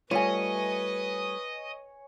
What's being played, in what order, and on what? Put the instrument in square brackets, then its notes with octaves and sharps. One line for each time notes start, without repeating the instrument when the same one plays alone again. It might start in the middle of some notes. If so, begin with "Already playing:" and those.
[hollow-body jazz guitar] G3 A3 F4 [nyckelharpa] B4 [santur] C#5 G#5 [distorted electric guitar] D#5